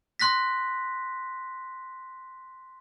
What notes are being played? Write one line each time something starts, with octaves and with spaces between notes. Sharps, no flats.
C6 F#6 A#6 B6